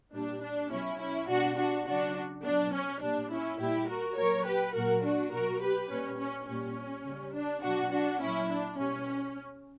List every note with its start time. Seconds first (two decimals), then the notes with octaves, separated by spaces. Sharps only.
0.13 A#2 G3 D4
0.42 D4
0.71 B2 F#3 C#4 E4
1.00 C#4 E4
1.28 B2 G3 D4 F#4
1.57 D4 F#4
1.87 C#3 F#3 D4 F#4
2.44 B2 F#3 D4
2.74 C#4
3.01 A#2 G3 D4
3.31 C#4 E4
3.59 A#2 G3 E4 G4
3.88 F#4 A#4
4.17 A#2 F#3 A#4 C#5
4.46 G4 B4
4.74 A#2 F#3 F#4 A#4
5.03 D4 F#4
5.32 B2 F#3 F#4 A#4
5.61 G4 B4
5.90 A#2 G3 C#4
6.20 C#4
6.48 A#2 G3 C#4
7.05 C#3 G3
7.34 D4
7.62 B2 F#3 D4 F#4
7.91 D4 F#4
8.20 A#2 F#3 C#4 E4
8.50 D4
8.78 B2 G3 C#4